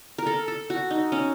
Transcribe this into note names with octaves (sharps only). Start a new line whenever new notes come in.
A#4
A4
A4
F#4
D#4
C#4